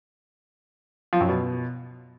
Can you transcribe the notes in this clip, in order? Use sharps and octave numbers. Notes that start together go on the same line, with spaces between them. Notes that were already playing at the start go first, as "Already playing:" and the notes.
F3
F#2
B2